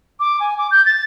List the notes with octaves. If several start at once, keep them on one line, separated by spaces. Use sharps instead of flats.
D6
G#5
D6
G6
A6